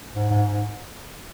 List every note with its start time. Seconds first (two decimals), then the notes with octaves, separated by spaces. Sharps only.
0.15 G#2
0.31 G#2
0.48 G#2